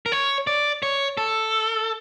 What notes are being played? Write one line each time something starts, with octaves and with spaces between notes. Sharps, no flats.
A#4
C#5
D5
C#5
A4